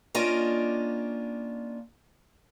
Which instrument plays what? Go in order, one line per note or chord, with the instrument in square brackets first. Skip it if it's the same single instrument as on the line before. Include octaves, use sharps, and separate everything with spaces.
[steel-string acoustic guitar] A#3 C#4 D4 F4 D#5